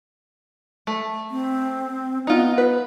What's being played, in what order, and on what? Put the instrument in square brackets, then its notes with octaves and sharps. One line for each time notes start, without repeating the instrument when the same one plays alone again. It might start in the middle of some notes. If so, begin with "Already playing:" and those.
[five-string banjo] A3
[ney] C4
[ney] B3 [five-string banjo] D#4 F4
[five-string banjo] B4